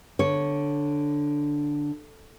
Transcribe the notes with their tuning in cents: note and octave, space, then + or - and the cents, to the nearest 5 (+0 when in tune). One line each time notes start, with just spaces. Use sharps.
D3 +0 C#5 +0